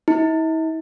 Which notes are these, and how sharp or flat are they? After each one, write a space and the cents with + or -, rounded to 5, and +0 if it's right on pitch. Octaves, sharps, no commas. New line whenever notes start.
E4 -45